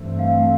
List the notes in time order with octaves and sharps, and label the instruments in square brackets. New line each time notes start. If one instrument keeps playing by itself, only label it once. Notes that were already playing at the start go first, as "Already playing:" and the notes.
Already playing: [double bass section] G2 E3 A3 C4
[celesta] F5
F5